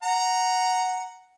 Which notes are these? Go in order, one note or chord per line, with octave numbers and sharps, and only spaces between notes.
F#5 A#5